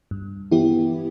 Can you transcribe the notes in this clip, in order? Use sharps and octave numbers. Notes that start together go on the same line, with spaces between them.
G2
E3 B3 E4 G4